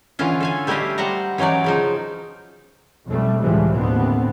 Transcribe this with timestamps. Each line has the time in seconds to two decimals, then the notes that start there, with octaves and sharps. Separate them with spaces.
0.19 D3 E3 C#4 F4
0.40 A4 F5 G#5
0.67 G3 A3 E4 G4 D#5 F5
0.98 G3 C5 F#5 A#5
1.38 E3 F#3 C#4 D#4 D5
1.64 C#3 F3 D#4
3.06 B1 F2 G3 A3
3.40 C#2 A2 E3 F3 G3 G#3
3.76 D#2 A2 D3 B3 C4